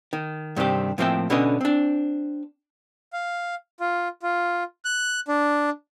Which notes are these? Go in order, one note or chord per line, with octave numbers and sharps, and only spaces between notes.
D#3
G2 C3 D#3 C4 G4
A2 F3 A#3 C4 E5 G5
B2 D3 C#4 B4 C#5 D#5
C4 D4
F5
F4
F4
F#6
D4